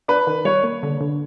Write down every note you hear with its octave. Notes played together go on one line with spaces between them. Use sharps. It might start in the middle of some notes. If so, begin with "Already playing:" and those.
D4 B4
D#3
G3 C#5
A#3
D3
D3